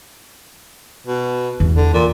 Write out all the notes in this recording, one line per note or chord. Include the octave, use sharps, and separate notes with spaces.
B2
E2
D3
A#2